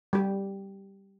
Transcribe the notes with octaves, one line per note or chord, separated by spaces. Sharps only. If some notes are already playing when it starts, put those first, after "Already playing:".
G3 G4